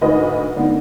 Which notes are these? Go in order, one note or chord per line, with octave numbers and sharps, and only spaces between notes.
D2 G#2 B4 D#5
D3 A#3 B3 D#4